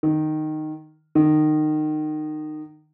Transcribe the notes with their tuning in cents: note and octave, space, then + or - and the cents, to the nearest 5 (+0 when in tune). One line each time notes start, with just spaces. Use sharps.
D#3 -10
D#3 -25